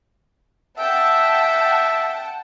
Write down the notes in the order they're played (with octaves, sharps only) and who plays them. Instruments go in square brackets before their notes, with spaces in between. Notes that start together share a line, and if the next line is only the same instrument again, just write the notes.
[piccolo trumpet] E5 [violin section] F#5 G5 A5